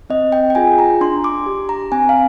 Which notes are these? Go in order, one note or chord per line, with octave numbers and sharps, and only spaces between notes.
C4 D#5
G5
G5
F4 G#4 G#5
A#5
D4 C6
D6
G4
A#5
C4 G#5
F5